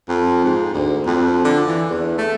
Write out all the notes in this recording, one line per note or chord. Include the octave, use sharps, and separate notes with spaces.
F2
G#2
D2
F2
D3
E3
E2
A3